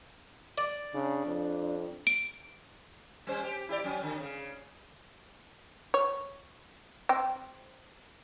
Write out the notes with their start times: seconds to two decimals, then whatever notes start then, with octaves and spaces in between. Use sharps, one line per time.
0.58 D5
0.94 C#3 D4
1.26 F2
2.07 D7
3.27 G3 C#4 C5
3.43 G4
3.69 E4 G4 D5
3.84 F#3 C#4
4.03 D3
4.20 C#3
5.94 C#5
7.09 C4 G5